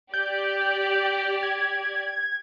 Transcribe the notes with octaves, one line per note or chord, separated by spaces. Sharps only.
G4 D5 G6
G#6